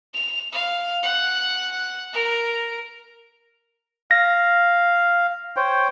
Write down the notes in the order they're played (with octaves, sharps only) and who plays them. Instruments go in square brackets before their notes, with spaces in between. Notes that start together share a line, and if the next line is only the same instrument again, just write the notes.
[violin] F7
F5
F#5
A#4
[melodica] F5 [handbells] A#6
[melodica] C5 C#5 G5